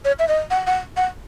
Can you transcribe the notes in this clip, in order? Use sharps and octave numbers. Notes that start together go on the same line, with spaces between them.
C#5
E5
D#5
F#5
F#5
F#5